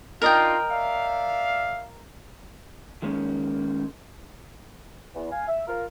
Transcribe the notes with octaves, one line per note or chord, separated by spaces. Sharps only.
D4 D#4 F4 A#4 D#5 G5
D5 E5 F5
D#3 G#3 A#3 C#4 D#4
E2
F5 G#5
E5
F4 A#4